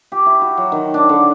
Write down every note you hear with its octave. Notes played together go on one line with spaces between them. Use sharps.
G4
E4
F#4
F#3
D#3
D4
D3